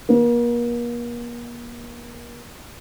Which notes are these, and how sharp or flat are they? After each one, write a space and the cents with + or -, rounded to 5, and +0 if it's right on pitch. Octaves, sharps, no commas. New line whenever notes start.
A#3 +40